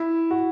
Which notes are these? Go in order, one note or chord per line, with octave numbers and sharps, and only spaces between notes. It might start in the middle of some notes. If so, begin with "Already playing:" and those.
Already playing: E4
F#4